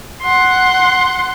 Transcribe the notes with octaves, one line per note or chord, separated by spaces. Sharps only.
F#5 C6